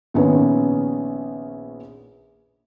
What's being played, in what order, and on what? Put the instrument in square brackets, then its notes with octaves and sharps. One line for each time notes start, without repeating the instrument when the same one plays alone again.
[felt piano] A#1 D#3 B3 C#4